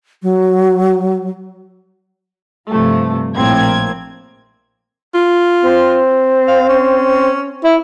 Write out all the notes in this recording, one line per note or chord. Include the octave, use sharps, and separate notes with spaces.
F#3
G2 C3 F3 A3
A#1 A2 A#3 C4 G#6
F4
C4
F5
C#4
E4